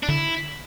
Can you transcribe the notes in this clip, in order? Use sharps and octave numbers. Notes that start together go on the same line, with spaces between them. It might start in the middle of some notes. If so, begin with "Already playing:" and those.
D4
D3 E4